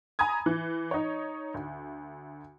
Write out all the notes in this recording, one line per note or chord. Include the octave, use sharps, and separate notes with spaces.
G#5 A#5 B5 D#6 G#6
E3
D#4 C#5
D2